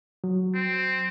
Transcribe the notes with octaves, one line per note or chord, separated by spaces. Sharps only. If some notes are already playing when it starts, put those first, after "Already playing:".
F#3
C4